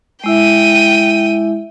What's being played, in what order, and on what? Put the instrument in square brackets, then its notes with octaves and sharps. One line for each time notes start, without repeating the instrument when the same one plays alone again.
[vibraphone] G#3 E4 E5 [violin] G5 D#7